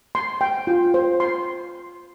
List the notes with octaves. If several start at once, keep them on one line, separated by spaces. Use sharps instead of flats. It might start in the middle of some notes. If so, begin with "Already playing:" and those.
C6
G5
F4
C5
C6